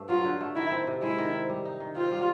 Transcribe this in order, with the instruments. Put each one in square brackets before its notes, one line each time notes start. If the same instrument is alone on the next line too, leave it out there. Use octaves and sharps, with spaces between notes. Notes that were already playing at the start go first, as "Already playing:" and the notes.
Already playing: [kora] G2 A3
[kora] F#3 [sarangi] F4
[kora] D3
A3
[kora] D#3 [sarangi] E4
[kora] C4
C3
[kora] G#3 [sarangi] E4
[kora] D#3
C4
G3
D#4
D#3
[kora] C4 [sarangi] F4
[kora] G3